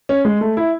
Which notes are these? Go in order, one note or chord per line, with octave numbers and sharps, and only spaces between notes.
C#4
G#3
A3
E4